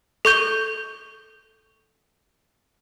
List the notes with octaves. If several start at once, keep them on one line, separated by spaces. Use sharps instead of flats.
A4 C#6 G6 G7